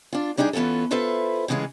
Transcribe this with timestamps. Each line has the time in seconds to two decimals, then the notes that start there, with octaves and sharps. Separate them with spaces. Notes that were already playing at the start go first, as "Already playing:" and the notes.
0.13 D4 F4
0.37 G3 D4 D#4 G4 G#4
0.53 E3 B3 C#4 F4 A4
0.91 E4 F4 A4 B4 C5 E5
1.48 A2 C#3 E3 G#3 C#4 F4